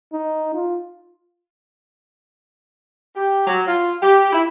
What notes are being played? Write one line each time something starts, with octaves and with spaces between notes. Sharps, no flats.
D#4
F4
G4
F#3
F4
G4
E4